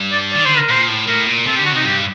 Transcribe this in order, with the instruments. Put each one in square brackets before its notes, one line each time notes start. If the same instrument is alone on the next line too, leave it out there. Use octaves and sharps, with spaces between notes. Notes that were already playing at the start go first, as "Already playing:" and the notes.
Already playing: [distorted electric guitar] G2
[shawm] D5
[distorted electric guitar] D#3 [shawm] D5
[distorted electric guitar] D3 [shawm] C5
[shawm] A#4
[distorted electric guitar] A#2 [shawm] C5
[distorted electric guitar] A2
[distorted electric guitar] A2 [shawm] A#4
[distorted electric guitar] A#2
[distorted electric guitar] C3 [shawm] A4
[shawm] G4
[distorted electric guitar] D3
[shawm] F#4
[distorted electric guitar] C3 [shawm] D#4
[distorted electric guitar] G2 [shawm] G4